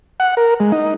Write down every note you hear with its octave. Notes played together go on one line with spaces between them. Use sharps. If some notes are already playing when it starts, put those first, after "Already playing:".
F#5
A#4
G#3
D#4